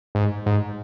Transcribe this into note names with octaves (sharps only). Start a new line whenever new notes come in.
G#2
G#2